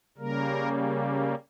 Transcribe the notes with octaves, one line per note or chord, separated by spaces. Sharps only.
C#3 G3 A#3 A#4